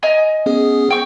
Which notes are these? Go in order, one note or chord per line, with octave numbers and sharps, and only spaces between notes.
D#5 G#5 A#5
B3 C#4 G#4
G5 C#6